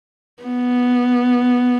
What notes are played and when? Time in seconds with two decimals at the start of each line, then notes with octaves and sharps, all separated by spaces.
0.43 B3